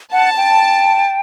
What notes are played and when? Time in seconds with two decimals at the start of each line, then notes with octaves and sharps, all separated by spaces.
0.12 F#5 A5
0.37 G5